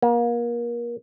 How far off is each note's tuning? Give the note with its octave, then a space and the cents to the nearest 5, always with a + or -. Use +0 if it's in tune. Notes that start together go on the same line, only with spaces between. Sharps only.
A#3 +30